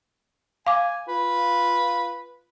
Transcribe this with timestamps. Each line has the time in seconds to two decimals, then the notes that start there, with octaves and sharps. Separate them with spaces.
0.67 F5 G#5 D6
1.08 F4 B4